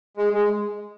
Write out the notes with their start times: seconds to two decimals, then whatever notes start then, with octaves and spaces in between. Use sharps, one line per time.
0.17 G#3
0.33 G#3